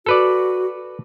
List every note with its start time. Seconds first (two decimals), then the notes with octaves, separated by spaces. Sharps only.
0.06 F#4 A4 B4 D5